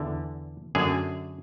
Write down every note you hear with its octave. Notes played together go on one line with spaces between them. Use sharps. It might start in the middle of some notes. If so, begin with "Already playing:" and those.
Already playing: E2 D3
F#2 D3 G#4